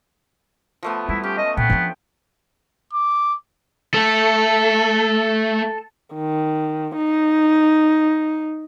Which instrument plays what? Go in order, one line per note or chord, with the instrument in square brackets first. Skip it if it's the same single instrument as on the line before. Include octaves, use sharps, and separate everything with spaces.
[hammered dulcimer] F3 A3 B3
[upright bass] G3 [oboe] E4
[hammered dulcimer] C#4 [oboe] G4
[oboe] D#5
[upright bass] A#2 [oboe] B3 [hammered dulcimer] G5
[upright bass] F3 D4
[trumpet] D6
[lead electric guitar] A3 [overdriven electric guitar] A4
[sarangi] D#3
D#4